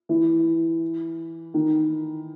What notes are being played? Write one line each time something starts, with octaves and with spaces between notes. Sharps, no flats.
E3
D#3